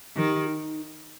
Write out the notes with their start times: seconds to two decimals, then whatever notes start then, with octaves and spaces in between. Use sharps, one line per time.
0.17 D#3 G4
0.47 D#4